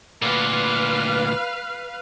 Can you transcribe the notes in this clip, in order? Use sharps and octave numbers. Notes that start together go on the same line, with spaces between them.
D2 A#2 B4 F5